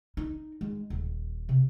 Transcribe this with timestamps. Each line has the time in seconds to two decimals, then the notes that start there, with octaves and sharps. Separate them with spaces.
0.17 D#4
0.61 G#3
0.90 D#1
1.49 C3